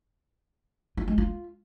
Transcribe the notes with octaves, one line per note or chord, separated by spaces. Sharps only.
F4
G#3
F4